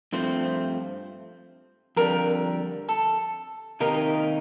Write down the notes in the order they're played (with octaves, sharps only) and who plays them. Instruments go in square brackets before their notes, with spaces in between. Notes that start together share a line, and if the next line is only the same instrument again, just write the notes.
[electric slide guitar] G2 F3 A3 C4 [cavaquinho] C5
[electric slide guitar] F2 D3 G3 [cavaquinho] A#4
[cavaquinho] A4
[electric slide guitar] C3 D#3 A#3 D#4 G4 [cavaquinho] A#4